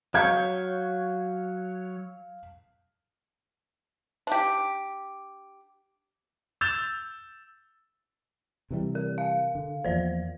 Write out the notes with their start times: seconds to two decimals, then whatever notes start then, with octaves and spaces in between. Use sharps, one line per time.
0.14 F#3 C#5 F5 G6 G#6
4.27 D4 G4
6.61 E6 G6 A6 E7 F7
8.71 C3 E3 G3
8.95 A#4
9.18 F5
9.55 D3
9.84 E2 F3 A#3 C5 D5